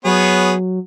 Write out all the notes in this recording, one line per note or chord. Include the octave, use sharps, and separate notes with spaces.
F#3 B3 G#4 C#5